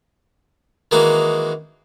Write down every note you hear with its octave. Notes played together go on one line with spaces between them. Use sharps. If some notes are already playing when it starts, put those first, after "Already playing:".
D#3 E3 G#3 A#3 D#4 F#4